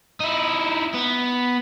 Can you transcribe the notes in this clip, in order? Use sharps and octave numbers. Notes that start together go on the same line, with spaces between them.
D#4 E4
B3